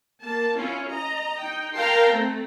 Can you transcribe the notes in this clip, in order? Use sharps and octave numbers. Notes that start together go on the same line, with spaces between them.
A#3 A5
C#4 E4 F4
D#5 A#5
D#4 G5
A#4 F5 G5 A5 A#5 C6
A3 C4